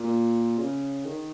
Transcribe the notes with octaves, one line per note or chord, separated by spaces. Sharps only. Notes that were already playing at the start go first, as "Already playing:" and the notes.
Already playing: A#2
C#3
D#3